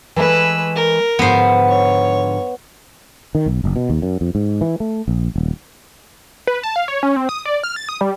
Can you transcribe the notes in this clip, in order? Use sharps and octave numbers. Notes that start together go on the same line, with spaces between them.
E3 G#3 A3 B4 E6
A#4
G#2 D3 F3 B3 C5
C#5
D#3
B1
F#1
B2
D#2
F#2
F2
G#2
E3
A3
A#1
D#1
B4
A5
F5
C#5
C#4
C4
D#6
D5
F6
A6
D#6
G3